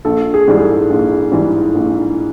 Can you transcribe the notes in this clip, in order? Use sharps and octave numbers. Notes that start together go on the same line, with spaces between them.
A#1 A4
G#4
G#2 E3 G3
G#4
A4
A#1
G#2 E3 G3
A#1